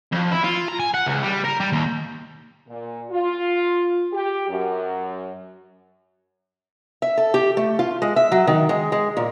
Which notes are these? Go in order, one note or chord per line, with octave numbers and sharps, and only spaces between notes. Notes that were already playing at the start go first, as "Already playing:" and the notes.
F2
E4
F4
A#5
G#5
F#5
C#2
G3
A#4
G3
D#2
A#2
F4
G4
F#2
E5
A4
G4
A3
F4
G#3
E5
F#3
D#3
G#3
G#3
A#2